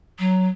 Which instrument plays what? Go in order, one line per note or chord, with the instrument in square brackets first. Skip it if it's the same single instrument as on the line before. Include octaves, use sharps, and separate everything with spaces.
[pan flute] F#3